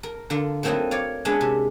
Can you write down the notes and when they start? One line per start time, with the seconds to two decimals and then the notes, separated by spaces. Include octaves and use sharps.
0.03 A#4
0.30 D3 F4 A#4
0.63 F#3 A3 A#3 C4 D#4 E4
0.91 C#5 D5 F5
1.25 G#3 B3 C#4 D4 E5 F#5
1.41 C3